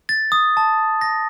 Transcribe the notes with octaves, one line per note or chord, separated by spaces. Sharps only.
A6
D#6
A5
A#6